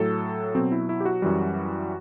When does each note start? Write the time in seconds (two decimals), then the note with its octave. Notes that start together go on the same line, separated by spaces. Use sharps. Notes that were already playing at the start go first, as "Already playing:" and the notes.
Already playing: A2 F#3 A4
0.55 B2 F#3 C4
0.72 E4
0.89 E4
1.00 G4
1.06 F#4
1.22 F#2 E3 G3